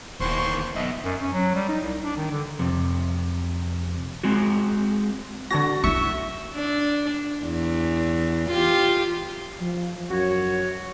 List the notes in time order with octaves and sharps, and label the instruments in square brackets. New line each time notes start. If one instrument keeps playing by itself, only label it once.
[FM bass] D#1 [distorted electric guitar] D#2 E3 [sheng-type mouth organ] C5 C6 C#6
[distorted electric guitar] B1 [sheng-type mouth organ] D#5 E5
[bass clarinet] F#2
C#4
F#3
G3
D#4
C2
D4
D#3
D3
[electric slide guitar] F2 C3
G#3 C4 F#4
[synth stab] D3 A#6 [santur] F#4 C#5 A5
[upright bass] D#4 E4 [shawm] E5 [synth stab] C#6
[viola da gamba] D4
E2
F4 G4
[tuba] F3
[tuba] F#2 [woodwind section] F#4 C#5